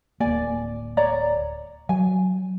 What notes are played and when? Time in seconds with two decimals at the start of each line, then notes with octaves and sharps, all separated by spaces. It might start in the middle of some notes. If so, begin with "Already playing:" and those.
0.20 D1 A#3 D5 G#5
0.97 C#5 D5 A#5
1.89 F#3 G#5